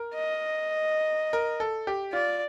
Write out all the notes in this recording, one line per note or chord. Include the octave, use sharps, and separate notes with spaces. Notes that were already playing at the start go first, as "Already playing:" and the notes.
Already playing: A#4
D#5
A#4
A4
G4
F4 D5